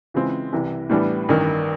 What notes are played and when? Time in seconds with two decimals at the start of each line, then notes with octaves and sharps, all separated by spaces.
0.14 C#3 E3 G#3 C4 F4
0.52 C2 C3 E3
0.90 A2 E3 G3 B3 D4
1.29 A1 G2 D#3